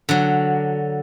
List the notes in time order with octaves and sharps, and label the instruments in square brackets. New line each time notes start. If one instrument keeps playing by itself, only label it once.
[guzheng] D3 F#3